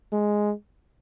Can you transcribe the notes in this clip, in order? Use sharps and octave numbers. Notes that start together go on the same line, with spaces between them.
G#3